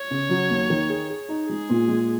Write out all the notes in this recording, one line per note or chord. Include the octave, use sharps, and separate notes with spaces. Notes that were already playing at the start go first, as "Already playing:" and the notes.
Already playing: C#5
C#3
F#3
D#2
D#3
G#4
G#4
D#4
G#3 G#4
A#2
G#3